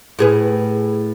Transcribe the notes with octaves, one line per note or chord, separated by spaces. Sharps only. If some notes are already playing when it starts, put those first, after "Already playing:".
A2 G#4 B4